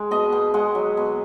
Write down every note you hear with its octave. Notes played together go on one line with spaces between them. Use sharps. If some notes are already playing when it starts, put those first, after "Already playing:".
Already playing: G#3
B2 D#5
B2
G#3 F#5
F#3
B2